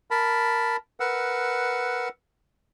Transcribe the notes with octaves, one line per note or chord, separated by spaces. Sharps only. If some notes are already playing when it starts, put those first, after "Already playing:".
A#4 A5 B5
A#4 B4 F#5 E6